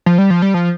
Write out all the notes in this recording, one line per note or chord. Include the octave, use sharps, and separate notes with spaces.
F3
G3
F3
G3
F3